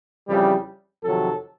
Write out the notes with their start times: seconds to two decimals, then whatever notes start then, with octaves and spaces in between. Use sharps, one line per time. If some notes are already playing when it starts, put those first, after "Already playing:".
0.28 F2 C#3 E3 G3
1.03 F2 C3 D#3 F#3 A4